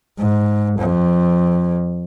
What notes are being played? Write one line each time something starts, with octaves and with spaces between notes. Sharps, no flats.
G#2
F2